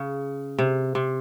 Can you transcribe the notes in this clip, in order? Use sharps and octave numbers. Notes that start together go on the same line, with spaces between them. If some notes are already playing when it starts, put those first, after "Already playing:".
Already playing: C#3
C3
C3